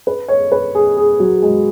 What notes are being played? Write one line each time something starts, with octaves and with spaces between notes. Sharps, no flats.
B4
C#5
B4
G#4
G#4
F#3
G#3